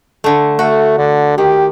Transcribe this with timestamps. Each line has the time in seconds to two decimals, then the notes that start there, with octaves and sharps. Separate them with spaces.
0.24 D3 A3
0.59 A3 F#4
0.98 D3
1.38 D#3 G4